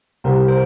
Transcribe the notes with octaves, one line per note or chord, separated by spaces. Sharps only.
C2 C3 G3 C4 A#4
C5